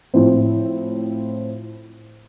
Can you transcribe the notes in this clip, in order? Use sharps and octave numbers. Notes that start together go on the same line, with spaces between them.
A2 F3 C4 E4